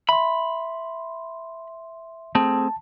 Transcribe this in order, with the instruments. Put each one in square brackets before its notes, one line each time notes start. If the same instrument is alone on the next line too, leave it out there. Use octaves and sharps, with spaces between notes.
[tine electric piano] E5 C6 [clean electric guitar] B5
[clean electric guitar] A3 C4 G#4 [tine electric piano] A5